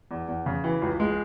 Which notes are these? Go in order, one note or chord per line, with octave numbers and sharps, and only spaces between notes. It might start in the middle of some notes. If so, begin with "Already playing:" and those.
E2
E2
C#3
E3
C#2
G#3